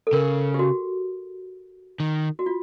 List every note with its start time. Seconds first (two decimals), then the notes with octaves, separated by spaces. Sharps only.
0.07 A4
0.13 C#3 A#4
0.54 G4
0.59 F#4
2.00 D#3
2.39 F#4
2.46 F4